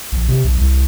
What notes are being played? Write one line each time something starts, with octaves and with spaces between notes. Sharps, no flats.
A#1
C3
B1
C2